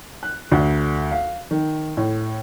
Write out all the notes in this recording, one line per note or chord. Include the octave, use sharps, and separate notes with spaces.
F#6
D2
F5
D#3
A2